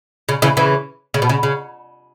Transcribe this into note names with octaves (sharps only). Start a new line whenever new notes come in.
C#3
C#3 E3
C#3 E3
C#3
B2
C#3
C#3